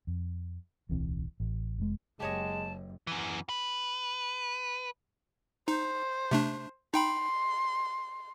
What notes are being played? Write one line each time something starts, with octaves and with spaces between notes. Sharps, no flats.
F2
D1 B1 E3 C4
A1
F1 G#3
F#1 G#3 G4 C#5 D#5 A5
F#2 E3
B4
D#4 C5
C3 A3 D4
D#4 G5 B5 C6